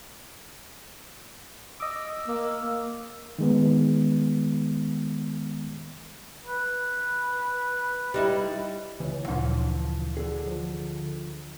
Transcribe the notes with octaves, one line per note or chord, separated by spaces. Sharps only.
D#5 D6 E6
A#3
D#3 G#3 B3
B4
G3 D#4 E4
C#2 E3
D2 A#2 C#3 F3 C6
D3 G#4
F3